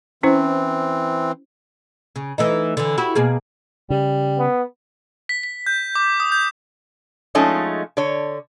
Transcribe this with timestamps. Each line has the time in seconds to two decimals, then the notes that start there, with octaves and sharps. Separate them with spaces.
0.23 E3 C4 C#4 E4 C5
2.16 C#3
2.38 E3 A3 D#4
2.77 D3 E3
2.98 E4 F#4 G4
3.15 B2 A#3 G#4
3.90 C#3 G3
4.39 B3
5.29 B6
5.43 B6
5.67 G6
5.95 D6
6.20 D#6
6.32 G6
7.35 F3 G#3 A3 C#4 D#4
7.97 D3 C#5